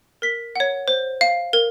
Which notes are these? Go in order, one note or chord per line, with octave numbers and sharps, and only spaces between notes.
A#4 B6
C#5 F#5
C5
F5
A#4